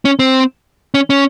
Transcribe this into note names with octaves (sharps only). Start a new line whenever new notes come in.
C#4
C4
C#4
C#4